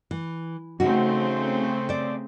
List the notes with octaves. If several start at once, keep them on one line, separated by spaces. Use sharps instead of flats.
E3
C#3 A3 C4 D#4 F#4
C5 D5